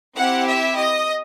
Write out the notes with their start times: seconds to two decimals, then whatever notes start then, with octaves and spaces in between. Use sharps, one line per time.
0.16 C4 E4 G4 F#5
0.46 E5
0.77 D#5